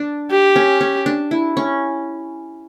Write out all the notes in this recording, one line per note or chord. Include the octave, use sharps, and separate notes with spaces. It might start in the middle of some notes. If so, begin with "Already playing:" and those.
Already playing: D4
G4
C#4
C#4
D4
E4
C#4